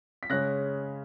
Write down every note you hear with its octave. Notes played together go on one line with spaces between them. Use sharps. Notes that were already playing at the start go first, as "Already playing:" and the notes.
B6
C#3 G#3 C#4 F#6 A#6